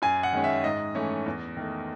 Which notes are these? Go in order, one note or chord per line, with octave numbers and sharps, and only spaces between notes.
F#2 G#5
F#5
D#3 G#3 C#4
E5
G#2 D#5
E3 A3 C#4
E2
D#3 A3